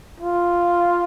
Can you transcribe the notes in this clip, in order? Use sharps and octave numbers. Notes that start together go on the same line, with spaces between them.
F4